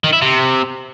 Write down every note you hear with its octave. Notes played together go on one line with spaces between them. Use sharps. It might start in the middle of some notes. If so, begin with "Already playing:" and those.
D#3
E4
C3